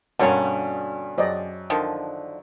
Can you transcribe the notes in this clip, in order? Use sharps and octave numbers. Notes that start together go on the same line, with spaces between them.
G2 B2 D3 A#3 C#4 C#5 D5 F#5
F#2 C5 D5 D#5
D3 D#3 F3